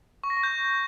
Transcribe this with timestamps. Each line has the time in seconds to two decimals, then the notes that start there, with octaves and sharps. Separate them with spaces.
0.24 C#6
0.30 A#6
0.37 C#6
0.43 G6